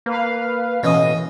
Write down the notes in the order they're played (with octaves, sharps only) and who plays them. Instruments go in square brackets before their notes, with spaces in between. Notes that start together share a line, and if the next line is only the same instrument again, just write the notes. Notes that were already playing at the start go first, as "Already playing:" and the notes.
[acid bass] A#3 [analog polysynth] B4 F5
[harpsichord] A1 E3 C#4 [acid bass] B2 [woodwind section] D#5 D#6